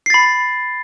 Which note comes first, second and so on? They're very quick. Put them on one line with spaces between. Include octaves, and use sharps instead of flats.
C7 A6 B5